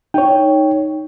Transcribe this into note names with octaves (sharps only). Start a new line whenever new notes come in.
D#4 C#5 G5